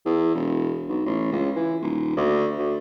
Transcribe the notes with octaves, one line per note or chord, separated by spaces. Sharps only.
E2
E1
B1
A1
C#2
E3
D#1
D2
D2